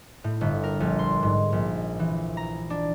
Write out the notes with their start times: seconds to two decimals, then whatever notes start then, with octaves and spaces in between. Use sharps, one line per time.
0.24 A2
0.41 G1
0.64 A#4
0.80 A#1
0.99 C6
1.23 G#2
1.52 A#1
1.99 E3
2.37 A#5
2.70 D4